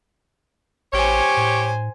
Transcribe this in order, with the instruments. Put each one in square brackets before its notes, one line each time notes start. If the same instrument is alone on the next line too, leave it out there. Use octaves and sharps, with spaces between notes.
[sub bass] A1 [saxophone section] G4 C#5 [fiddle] C5 G#5
[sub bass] A2